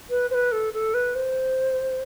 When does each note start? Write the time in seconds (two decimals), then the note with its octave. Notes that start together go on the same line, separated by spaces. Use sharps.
0.10 B4
0.31 C5
0.34 B4
0.52 A4
0.73 A4
0.94 B4
1.15 C5